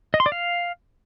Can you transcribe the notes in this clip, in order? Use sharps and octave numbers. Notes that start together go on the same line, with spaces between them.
D#5
C6
D5
F5